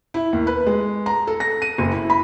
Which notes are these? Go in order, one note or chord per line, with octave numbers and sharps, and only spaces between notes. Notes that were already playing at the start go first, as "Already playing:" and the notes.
E4
D#2
B4
G#3
A#5
A4
A#6
D#7
F#1
E4
B5